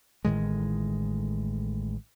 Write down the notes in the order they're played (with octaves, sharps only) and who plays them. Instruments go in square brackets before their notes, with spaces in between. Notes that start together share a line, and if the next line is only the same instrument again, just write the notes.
[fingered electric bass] A1 A2 D#3 G#3